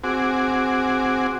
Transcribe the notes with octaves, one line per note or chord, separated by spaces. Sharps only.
C4 F#4 G#4 D6